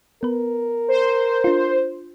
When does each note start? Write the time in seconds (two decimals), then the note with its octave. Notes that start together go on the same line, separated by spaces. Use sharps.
0.23 B3 A#4 B4
0.88 C5
1.44 D4 F4